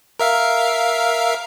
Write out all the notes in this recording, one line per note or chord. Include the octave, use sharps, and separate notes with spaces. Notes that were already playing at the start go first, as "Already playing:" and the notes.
A#4 E5 F5